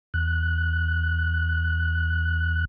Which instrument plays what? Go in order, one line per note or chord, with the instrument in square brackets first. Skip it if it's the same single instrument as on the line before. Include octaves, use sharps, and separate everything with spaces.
[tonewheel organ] E2 F#6